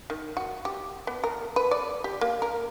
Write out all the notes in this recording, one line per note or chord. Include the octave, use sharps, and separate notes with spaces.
D#3
F#4
G4
B3
A#4
B4
D5
G4
A#3
A#4